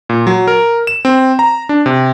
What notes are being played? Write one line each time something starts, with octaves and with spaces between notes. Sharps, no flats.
A#2
F#3
A#4
E7
C4
A#5
D4
C3